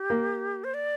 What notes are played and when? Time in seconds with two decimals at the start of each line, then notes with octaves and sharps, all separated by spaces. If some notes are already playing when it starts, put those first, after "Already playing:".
Already playing: G4
0.10 A#3
0.64 C5
0.74 D5